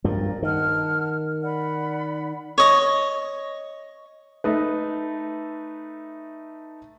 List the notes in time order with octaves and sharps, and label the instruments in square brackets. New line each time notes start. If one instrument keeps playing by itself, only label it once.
[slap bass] G2 F3 [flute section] A#4 D5
[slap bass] D#3 [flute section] F#5 A5 F6
[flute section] D5 F#5 B5
[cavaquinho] C#5 D#5
[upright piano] A3 D#4 B4